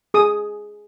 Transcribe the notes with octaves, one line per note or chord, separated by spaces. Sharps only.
G#4 D#6